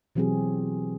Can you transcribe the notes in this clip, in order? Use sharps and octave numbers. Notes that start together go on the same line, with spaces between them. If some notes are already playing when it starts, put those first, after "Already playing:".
B2 E3 F#3 C4 G4 G#4